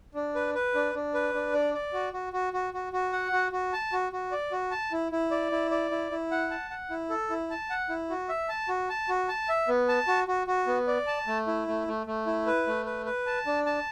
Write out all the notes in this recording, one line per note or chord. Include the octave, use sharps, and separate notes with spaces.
D4
B4
B4
D4
D4
B4
D4
D5
D5
F#4
F#4
F#4
F#4
F#4
F#4
F#5
F#4
F#4
A5
F#4
F#4
D5
F#4
A5
E4
E4
D5
E4
D5
E4
E4
F#5
A5
F#5
E4
A4
E4
A5
F#5
E4
F#4
E5
A5
F#4
A5
F#4
A5
E5
B3
A5
F#4
F#4
F#4
B3
D5
A5
A3
E4
A3
A3
A3
E4
B4
A3
B4
B4
A5
D4
A5